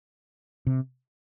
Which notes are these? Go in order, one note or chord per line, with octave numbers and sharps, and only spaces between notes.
C3